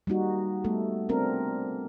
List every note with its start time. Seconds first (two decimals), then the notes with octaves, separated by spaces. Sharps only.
0.07 G3 A#3 D#4 F#4
0.64 G3 A3 B3 A4
1.09 B3 C4 D4 A#4